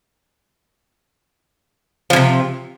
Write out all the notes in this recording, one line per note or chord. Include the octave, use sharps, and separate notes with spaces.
A2 C3 F3